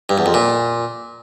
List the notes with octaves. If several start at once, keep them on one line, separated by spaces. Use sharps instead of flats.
G2
E2
F2
A#2